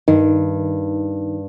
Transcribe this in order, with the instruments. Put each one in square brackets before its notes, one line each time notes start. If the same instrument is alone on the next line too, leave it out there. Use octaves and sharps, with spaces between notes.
[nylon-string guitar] G2 [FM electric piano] D#3